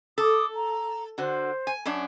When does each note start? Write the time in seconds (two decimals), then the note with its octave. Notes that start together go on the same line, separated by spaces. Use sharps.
0.18 A4 D6 D#6
0.55 A#5
1.18 D3 F#4 C5
1.67 G#5
1.85 F#2 C#4 D4